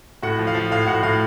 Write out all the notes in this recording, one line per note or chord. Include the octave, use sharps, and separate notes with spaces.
A2 F#4 F#5
F3
F5
F3
A2 F5
A2 F#4 F#5
A2 F5